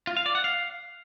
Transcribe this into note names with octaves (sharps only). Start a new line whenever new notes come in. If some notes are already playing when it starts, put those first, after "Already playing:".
F4
F5
D5
F#5
F5